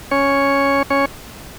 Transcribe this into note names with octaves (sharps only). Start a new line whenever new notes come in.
C#4 C#5
C#4 C#5